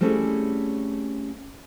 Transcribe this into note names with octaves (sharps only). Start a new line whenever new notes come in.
G3 A3 C4 C#4 E4 G#4